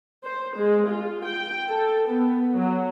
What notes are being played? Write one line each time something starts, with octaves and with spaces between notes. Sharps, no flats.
C5
G#3
F4
G5
A4
B3
F#3